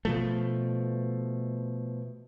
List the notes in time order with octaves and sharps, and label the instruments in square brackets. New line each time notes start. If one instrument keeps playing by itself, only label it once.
[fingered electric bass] B2 F3 A3